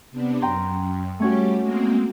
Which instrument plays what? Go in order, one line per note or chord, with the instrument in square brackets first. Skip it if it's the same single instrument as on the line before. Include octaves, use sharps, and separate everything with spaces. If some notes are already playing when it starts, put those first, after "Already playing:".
[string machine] C3 B3 D4
[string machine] F#2 [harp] G5 A#5 C6
[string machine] G3 G4 [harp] A3 C#4 F#4
[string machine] G#3 A#3 C4